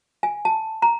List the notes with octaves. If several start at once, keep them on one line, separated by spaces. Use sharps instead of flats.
G#5
A5
A#5